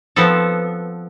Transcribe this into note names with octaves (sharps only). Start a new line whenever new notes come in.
F3 B3 C4 A4